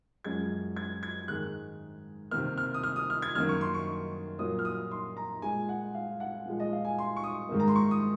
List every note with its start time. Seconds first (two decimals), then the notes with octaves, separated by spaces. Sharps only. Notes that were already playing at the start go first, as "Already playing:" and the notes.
0.24 F#2 F3 G#3 G#6
0.76 G#6
1.03 G#6
1.28 G#2 D#3 G#3 F#6
2.31 C3 D#3 A#3 F6
2.58 F6
2.74 D#6
2.83 F6
2.96 D#6
3.10 F6
3.22 G#6
3.35 F#2 D#3 A#3 F6
3.49 C#6
3.61 C6
3.74 C#6
4.39 A#2 F#3 A#3 D#6
4.59 F6
4.65 D#6
4.91 C6
5.17 A#5
5.42 A#2 G#3 G#5
5.69 F#5
5.95 F5
6.20 F#5
6.45 A#2 F3 G#3
6.60 D#5
6.72 F5
6.85 G#5
6.98 C6
7.16 C#6
7.24 D#6
7.49 G#2 D#3 A#3
7.60 A#5
7.68 C6
7.75 C#6
7.91 D#6